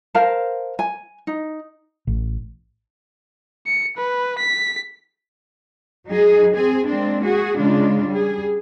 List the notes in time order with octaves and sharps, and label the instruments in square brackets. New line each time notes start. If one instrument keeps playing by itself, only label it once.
[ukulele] A#4 C5 F5 A5
G#5
D#4
[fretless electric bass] A1
[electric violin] C#7
B4
B6
[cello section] F#3 D#4 G#4
C4 G#4
G#3 A#3 C4 D4
F#4 G#4
C#3 G#3 D4 F4
G3 G#4